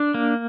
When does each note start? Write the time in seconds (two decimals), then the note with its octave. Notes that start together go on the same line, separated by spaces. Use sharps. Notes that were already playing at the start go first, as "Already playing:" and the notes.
Already playing: D4
0.14 A#3